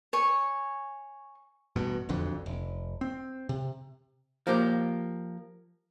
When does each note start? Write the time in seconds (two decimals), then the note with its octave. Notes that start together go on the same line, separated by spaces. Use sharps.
0.13 C#5 G#5 C#6
1.76 A1 G2 B2
2.09 E1 B1 F2 D3
2.46 F1
3.01 C4
3.49 C3
4.47 F3 A#3 G4